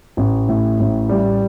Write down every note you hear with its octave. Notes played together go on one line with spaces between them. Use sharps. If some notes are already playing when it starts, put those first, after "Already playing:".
A1
A2
A1
G3